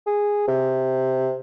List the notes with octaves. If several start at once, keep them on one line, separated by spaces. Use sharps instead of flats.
G#4
C3